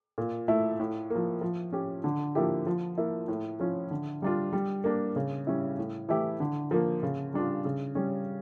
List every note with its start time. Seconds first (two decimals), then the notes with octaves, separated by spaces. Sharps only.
0.18 A#2
0.48 A3 E4
0.80 A2
1.10 A#3
1.16 F3
1.41 F3
1.72 C#4 G4
2.04 D3
2.35 F3 A#3 E4 G4
2.67 F3
2.98 A#3 E4
3.28 A2
3.60 F3 C#4 F4
3.91 D3
4.22 G3 D4 F4
4.53 G3
4.84 A#3 D4
5.16 C#3
5.47 G3 C#4 E4
5.78 A2
6.09 E3 A3 E4 G4
6.40 D3
6.71 F3 A#3
7.03 C#3
7.33 G3 D4 F4
7.65 C#3
7.95 G3 C#4